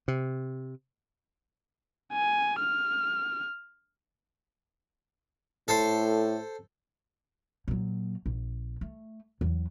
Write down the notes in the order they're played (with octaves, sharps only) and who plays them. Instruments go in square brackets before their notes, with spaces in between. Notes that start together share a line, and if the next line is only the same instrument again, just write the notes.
[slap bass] C3
[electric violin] G#5
F6
[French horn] A2 [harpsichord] A4 C5
[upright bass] A#2 F#3
A#1
A3
E2 F#3